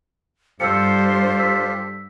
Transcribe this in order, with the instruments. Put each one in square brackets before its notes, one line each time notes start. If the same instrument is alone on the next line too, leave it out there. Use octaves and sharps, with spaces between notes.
[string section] G2 [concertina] F4 G4 A4 [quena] C5 [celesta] E6 C#7
[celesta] E6 B6